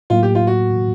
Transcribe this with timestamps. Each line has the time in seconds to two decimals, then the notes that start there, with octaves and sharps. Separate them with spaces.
0.10 A2 F#3 A#3 F4
0.23 G4
0.35 F4
0.47 F#4